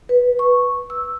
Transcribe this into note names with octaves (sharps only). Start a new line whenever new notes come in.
B4
C#6
E6